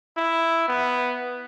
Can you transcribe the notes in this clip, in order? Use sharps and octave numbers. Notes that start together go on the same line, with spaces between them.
E4
B3